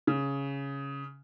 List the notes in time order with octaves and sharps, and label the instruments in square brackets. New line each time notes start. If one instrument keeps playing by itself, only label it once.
[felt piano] C#3